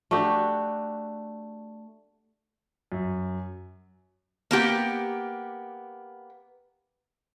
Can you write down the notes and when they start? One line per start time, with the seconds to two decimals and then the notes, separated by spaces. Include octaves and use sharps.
0.11 A3 D4 F#4 G4
2.92 F#2
4.51 A#3 B3 G4